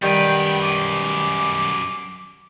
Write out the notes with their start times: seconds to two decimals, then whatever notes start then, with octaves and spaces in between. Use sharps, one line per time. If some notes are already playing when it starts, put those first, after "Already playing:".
0.02 F#2 D#3 G3 B4 G5
0.62 D6